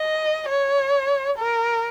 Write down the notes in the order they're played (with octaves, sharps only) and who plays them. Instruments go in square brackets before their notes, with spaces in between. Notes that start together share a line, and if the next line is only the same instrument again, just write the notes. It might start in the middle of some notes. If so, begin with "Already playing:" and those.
Already playing: [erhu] D#5
C#5
A#4